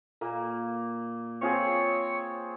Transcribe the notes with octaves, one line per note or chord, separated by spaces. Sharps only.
A#2 A#3
C4 F4 G#4 C#5